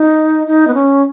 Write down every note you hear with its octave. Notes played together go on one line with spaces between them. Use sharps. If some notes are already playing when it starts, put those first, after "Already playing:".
Already playing: D#4
D#4
B3
C#4